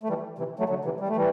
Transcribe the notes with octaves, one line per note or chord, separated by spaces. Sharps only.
A3
E3 G3
C3 E3
F#3 A3
D3 F#3
C3 E3
G3
A3
E3 G3